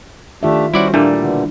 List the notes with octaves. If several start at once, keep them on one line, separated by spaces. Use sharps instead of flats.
D#3 A3 D4 F4 G4 E5
G3 C#4 E4 F#4 C5 D5 F#5
A#2 G3 A3 A#3 D4 E4
B2 D3